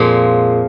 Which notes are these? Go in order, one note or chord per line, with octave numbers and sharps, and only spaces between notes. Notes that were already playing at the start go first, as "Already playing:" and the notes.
Already playing: F2 A#2 F3 G#3